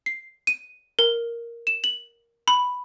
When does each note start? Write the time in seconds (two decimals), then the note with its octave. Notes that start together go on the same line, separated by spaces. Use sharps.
0.06 C7
0.47 D#7
0.99 A#4
1.67 E7
1.84 F#7
2.48 B5